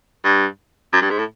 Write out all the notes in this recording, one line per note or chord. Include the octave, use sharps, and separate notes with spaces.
G2
F#2
G2
G#2
A2